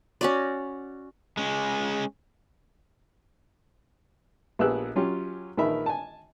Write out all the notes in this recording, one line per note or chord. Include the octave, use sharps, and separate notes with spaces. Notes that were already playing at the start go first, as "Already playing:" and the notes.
C#4 F#4 D5
G#3 C#4
A#1 B3 G4 G#4 E6 F#6
F#3 C#4 F4 G4
A#1 D#3 E3 A#4 E5 B5
G#5 A5